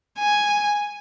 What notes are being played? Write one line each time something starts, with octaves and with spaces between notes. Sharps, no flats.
G#5